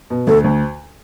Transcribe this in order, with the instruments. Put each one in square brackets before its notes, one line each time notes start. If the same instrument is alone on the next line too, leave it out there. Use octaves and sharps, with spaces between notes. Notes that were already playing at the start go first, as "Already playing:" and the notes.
[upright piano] B2
[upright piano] D2 [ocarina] A4
[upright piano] D2